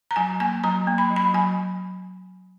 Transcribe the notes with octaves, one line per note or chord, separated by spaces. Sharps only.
A#5
F#3 G#5
A#3 G#5
F#3 A#5
A#3
B5
F#3
B5
F#3 G#5